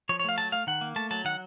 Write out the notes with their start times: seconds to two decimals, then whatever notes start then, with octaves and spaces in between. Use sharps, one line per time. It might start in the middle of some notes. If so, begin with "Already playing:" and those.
0.09 F3 C#5
0.20 C#5
0.24 A3 F5
0.38 F#3 A5
0.52 A3 F5
0.67 D#3 F#5
0.81 A#3
0.96 A3 A5
1.11 F#3 A5
1.24 D#3 F#5